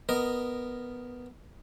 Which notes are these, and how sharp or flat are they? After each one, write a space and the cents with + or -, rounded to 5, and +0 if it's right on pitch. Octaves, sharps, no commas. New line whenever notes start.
B3 +0 A#4 +0 D#5 +0